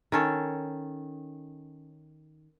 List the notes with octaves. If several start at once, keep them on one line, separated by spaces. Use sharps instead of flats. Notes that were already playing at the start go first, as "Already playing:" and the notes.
D#3 C#4 A4